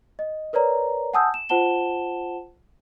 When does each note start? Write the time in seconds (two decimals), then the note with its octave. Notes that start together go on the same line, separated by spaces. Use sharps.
0.19 D#5
0.53 A#4 B4 C#5 D5 A#5
1.13 F#5 G#5 A5 D#6 E6 G6
1.34 E7
1.49 F4 C5 F#5 A5 E7 G7